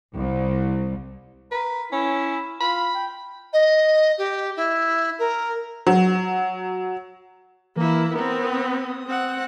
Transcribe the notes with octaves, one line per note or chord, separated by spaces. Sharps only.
C2
A#4 B4
C#4 E4
F4 B5
G5
D#5
G4
E4
A#4
F#3
E3 A#3 E4
B3 C4 A#4
D#6
C4 F#5